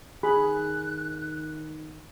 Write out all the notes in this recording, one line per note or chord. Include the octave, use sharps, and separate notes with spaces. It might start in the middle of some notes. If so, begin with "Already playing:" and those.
D#3 G#4 B5 F#6